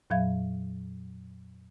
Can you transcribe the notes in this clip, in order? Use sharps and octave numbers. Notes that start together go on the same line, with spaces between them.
F2 A#2 F#3 E5 F5 G#6